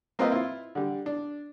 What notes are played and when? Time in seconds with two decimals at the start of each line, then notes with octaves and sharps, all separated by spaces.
0.19 A#3 C4 F4 B4 C5 D#5
0.32 E4 F4
0.75 D3 G3
1.06 D4